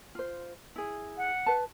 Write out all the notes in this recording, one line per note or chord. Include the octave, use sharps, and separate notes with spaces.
F4 C5
E4 G#4
F#5
B4 A5